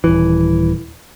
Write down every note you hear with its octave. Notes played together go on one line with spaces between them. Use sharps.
D#1 E3